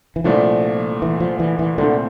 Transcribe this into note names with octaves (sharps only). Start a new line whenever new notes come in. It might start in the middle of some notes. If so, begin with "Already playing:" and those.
E3
C2 A#2 F3 A3 D4
E3
F3
E3
E3
C2 A#2 D3 A3 C4